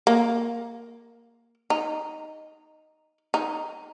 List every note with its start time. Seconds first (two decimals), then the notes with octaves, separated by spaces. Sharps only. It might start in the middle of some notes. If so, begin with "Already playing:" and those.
0.07 A#3
1.70 D#4
3.34 D#4